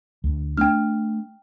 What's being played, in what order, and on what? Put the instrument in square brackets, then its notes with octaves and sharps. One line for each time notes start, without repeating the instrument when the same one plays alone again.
[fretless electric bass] D2
[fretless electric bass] A3 D4 [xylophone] G5 F6